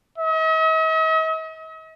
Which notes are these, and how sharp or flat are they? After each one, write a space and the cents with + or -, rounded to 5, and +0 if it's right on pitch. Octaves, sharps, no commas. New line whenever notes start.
D#5 +45